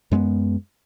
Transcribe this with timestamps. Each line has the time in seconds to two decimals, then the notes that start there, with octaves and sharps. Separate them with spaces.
0.12 F#2 G#3 A#3 B3